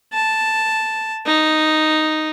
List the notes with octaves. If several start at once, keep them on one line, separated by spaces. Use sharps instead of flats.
A5
D#4